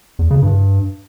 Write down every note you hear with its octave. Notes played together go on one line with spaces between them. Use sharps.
E2
C#3
G2